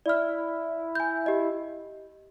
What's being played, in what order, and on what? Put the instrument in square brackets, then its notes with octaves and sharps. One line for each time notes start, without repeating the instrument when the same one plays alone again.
[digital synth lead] E4 [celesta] D5 F6
[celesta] G#5 G6
G4 D#5